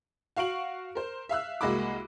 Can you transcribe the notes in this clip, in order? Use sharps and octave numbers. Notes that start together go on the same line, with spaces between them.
F#4 F5 C#6 D7 F#7
A#4 C5
E5 F5 E6 F#6
C2 G#3 A#3 F#4 B5 D6